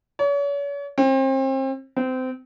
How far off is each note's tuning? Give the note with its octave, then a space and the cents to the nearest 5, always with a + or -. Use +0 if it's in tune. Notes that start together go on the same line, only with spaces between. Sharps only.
C#5 +40
C4 +35
C4 -25